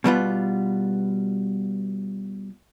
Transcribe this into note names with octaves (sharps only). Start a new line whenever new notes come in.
B2 G3 B3 F4